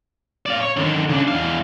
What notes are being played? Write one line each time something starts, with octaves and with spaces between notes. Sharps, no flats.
D5 F5
C#5
D3 D#3
C#3 D4
E2 F5